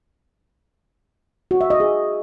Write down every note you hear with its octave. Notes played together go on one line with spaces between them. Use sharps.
F#4
E5
D#5
G#4